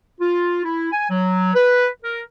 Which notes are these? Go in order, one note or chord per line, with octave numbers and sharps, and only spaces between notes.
F4
E4
G#5
F#3
B4
A#4